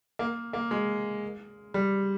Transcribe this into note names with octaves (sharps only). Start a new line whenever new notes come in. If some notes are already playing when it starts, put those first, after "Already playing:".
A#3
A#3
G#3
G3